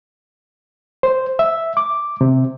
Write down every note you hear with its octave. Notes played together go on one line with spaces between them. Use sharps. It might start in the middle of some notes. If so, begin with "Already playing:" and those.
C5
E5
D6
C3